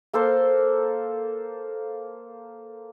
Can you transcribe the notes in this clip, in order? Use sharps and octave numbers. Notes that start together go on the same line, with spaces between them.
A#3 A4 A#4 C5